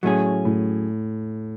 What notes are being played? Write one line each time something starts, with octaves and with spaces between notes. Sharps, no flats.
A2 F#3 A3 C#4 G#4
A2